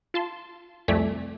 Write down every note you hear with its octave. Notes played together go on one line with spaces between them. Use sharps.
F4 A5 C6
C2 F2 A3 D5 G#5 B6